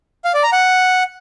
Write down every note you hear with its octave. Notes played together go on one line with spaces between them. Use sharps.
F5
D5
A#5
F#5